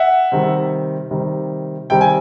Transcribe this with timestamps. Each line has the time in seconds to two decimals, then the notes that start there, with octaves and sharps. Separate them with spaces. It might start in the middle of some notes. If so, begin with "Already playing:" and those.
Already playing: E5 F#5
0.32 C3 D#3 G3
1.11 C3 D#3 G3
1.90 C3 D#3 G3 G5
2.01 G#5